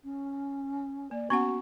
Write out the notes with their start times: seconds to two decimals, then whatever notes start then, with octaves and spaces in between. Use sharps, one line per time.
0.04 C#4
1.11 A#3 D5
1.30 B3 C#4 F#4 F#5 C#6